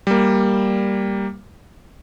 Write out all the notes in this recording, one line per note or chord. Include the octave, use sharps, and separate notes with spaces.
G3 A#3